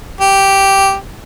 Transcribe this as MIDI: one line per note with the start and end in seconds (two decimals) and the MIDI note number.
0.21 0.95 67